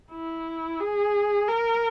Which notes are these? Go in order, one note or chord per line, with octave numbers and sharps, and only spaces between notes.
E4
G#4
A#4